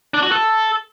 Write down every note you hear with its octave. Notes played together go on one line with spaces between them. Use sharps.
D4
F#4
A4